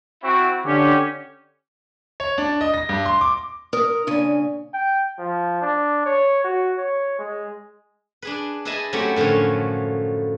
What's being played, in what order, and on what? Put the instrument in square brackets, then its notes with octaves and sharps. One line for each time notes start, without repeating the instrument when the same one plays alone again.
[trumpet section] C4 E4 F#4
[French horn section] D3 [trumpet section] C#4 G4
[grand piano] C#5
D4
D#5
A#6
G2
C6
D6
[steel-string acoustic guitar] A#4 [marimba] D#6
[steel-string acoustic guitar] A#2 C#3 G#5 [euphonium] D4
[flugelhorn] G5
F3
D4
C#5
F#4
C#5
G#3
[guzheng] D4 G#4 B4
E4 G#4 B4 D#5 E5 A5
F#3 A3 C4 C#4 E4 G4
F#2 A2 D3 F3 C#4